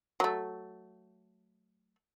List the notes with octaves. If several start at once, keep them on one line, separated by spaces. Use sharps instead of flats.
F#3 A3